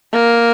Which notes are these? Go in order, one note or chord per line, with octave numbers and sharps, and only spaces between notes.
A#3